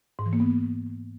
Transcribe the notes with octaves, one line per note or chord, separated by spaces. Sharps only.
G#2
E3
A#3
B3